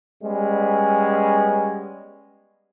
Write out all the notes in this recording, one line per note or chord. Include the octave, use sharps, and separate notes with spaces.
G3 G#3 B3 C#4